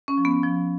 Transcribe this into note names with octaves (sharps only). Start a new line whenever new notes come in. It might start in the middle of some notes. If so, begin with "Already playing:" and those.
C#4
F3
B3
F3